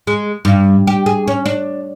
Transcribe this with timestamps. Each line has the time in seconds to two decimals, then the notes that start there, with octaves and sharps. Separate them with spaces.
0.07 G#3
0.45 G2
0.87 G4
1.06 G#4
1.28 C#4
1.46 D4